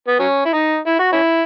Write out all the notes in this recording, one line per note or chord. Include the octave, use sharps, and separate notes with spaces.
B3
F#3 C#4
E4
D#4
E4
F#4
C#4 E4